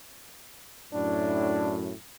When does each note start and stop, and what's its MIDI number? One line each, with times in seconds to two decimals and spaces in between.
0.93 1.93 42
0.93 1.93 45
0.93 1.76 62